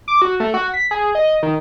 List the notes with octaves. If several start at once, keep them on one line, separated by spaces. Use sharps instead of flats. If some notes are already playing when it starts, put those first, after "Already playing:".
D6
F#4
A3
F#4
B6
G#4
D#5
D#3